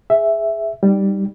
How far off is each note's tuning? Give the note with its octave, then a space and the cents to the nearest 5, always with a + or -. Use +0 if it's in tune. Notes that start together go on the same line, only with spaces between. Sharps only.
G#4 +0 E5 +0
G3 +0 D#4 +0